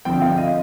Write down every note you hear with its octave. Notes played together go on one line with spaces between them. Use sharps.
D3 F3 C4 G5
F5
D#5